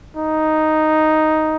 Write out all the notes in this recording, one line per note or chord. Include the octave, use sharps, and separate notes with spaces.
D#4